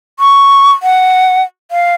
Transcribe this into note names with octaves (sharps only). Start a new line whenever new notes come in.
C#6
F#5
F5